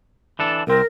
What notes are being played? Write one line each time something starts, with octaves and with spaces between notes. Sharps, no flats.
E3 D4 A4
C2 C4 A#4